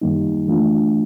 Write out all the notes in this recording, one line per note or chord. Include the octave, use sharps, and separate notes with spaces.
F#2 D#3 G3 A#3 D#4
E3 A3 D4 F4